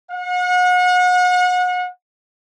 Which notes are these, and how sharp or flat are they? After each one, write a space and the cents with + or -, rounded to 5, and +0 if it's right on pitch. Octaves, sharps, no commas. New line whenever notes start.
F#5 -35